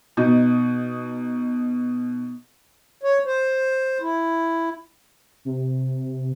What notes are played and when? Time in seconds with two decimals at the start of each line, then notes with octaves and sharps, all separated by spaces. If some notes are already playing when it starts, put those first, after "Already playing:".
0.17 B2 D#4
3.03 C#5
3.26 C5
4.00 E4
5.45 C3